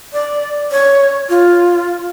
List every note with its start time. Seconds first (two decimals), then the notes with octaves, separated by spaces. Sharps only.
0.13 D5
0.72 C#5
1.29 F4